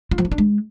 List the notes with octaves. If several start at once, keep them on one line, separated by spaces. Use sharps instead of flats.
F4
F3
F4
D4
G#3